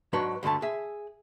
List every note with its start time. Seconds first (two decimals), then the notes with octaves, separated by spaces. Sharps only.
0.13 G#2 F#3 D4 B4 C#5 A5
0.43 D2 G2 D3 A3 A5
0.62 G#4 E5